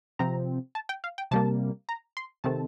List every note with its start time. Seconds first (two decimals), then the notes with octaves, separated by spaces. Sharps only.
0.19 C3 F3 C4 A#5
0.75 A5
0.89 G5
1.04 F5
1.18 G5
1.31 C3 G3 A#3 A5
1.89 A#5
2.17 C6
2.44 C3 D#3 A3 C4 A5